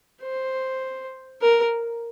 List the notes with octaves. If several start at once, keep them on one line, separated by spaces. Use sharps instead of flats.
C5
A#4